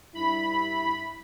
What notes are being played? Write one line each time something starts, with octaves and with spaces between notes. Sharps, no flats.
G2 E4 B5